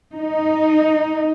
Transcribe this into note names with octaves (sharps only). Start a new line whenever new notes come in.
D#4